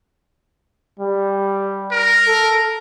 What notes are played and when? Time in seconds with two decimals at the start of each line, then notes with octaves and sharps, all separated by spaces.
0.99 G3
1.91 A#4
2.27 A4